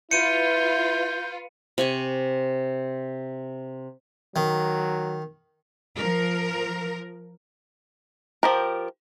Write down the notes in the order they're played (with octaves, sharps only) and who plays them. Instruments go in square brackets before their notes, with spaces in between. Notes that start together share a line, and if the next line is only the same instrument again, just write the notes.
[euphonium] E4 [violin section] F4 B4 [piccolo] G6 [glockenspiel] C#7 D#7
[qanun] C3 G#5 C#6
[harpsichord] D#3 [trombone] F#3
[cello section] F3 A#4
[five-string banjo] F3 G4 A#4